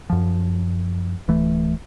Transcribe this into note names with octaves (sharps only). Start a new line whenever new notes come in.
F#2 F3
D1 E3 A3